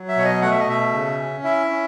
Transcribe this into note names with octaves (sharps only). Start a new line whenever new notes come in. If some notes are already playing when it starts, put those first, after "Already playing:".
Already playing: F#3
E5
B2 C#5
D#5
A3 F#5
E5
D#5
B2 E5
C#3
C#4
E4 E5
C#4